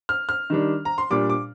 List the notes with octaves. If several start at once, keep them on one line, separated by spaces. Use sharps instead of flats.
F6
F6
D#3 G3 D4
A#5
C6
A#2 G3 D4 D6
D6